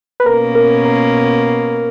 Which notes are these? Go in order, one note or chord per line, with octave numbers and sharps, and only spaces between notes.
B4
B2 A#3 C#4 A#4
A#4
A#4